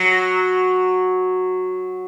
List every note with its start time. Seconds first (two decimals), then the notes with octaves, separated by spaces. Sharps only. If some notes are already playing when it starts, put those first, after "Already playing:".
Already playing: F#3